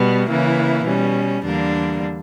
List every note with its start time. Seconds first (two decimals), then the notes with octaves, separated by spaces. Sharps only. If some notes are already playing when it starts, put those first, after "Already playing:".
Already playing: B2 G3 B3
0.27 C#3 E3 A#3 E4
0.85 B2 G3 C#4
1.44 E2 D3 G3 A#3 D4